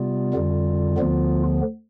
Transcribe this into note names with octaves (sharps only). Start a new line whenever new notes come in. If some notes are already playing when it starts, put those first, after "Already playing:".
Already playing: C3 G3 B3 F4
F2 D3 G3
D2 D3 F3 B3